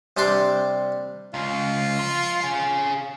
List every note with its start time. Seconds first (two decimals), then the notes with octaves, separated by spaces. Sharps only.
0.17 C3 G3 D4 C6 D6
1.34 C#2 F4
1.99 F3
2.41 G#4 F5